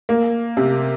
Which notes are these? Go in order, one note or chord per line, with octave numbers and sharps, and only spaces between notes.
A#3
C3